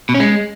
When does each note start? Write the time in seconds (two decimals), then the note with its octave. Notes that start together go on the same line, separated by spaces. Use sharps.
0.09 B2
0.14 C#4
0.20 G#3